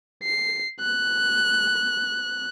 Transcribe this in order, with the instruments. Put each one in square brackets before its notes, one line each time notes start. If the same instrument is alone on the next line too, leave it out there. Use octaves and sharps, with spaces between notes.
[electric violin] C7
F#6